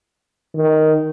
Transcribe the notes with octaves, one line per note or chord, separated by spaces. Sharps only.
D#3